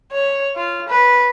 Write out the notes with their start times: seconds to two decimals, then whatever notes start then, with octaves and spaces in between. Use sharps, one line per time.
0.12 C#5
0.55 F4
0.88 B4